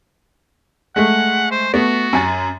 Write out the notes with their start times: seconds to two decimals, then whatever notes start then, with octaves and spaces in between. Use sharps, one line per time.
0.96 G#3 A3 F#5
1.51 C5
1.74 A3 B3 F#4
2.13 F#2 G#5 A6